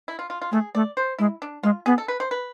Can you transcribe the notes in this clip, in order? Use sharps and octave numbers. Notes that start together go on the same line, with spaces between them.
E4
F4
F4
F4
A3 G#4
A3 D5
C5
G#3 E4
D4
G#3 F4
B3 G#4
A4
B4
C5
B4